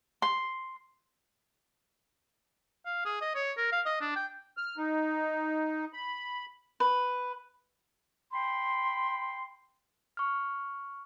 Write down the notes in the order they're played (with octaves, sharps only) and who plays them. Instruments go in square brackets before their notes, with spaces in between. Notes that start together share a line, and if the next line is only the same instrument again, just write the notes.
[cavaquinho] C6
[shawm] F5
G#4
D#5
C#5
A#4
F5
D#5
D4
G5
[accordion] F6
D#4
B5
[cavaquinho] B4
[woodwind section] G5 B5 C6
[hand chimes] C#6 F6